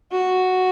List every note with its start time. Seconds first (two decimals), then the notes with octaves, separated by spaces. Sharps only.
0.12 F#4